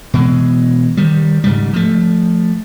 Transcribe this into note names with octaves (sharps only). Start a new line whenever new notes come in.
B2 E3 G#3
D#3 G3
G#2 C#3 G3
F3 A3